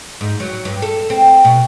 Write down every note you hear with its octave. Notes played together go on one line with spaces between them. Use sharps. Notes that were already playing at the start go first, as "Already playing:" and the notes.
G#2
F#3
G2
A4
C4
B2